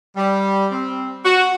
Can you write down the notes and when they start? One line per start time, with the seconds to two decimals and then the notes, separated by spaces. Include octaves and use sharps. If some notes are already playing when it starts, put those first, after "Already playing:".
0.16 G3
0.71 C4
1.24 F#4